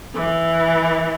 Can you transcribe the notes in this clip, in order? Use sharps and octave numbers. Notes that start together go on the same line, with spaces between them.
E3